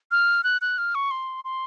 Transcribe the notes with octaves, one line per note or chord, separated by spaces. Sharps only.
F6
F#6
F#6
F6
C#6
C6
C6